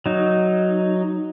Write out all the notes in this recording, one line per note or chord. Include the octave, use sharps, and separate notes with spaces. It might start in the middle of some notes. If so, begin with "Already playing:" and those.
F#3 D#4